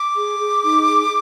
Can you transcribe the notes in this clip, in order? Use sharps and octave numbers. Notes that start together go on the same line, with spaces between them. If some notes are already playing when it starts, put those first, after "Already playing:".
Already playing: D6
G#4
G#4
D#4
G#4